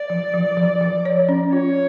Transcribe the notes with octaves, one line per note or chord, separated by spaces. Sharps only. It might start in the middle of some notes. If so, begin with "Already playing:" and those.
Already playing: D5
F3
F3
F3
F3
C#5
C#4
F4 C#5